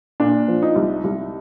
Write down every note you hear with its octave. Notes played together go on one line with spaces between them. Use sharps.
A#2 D4
F3
D#4
C2
C2